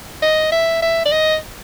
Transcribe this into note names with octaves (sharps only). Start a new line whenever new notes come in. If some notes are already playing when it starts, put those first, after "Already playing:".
D#5
E5
E5
D5
D#5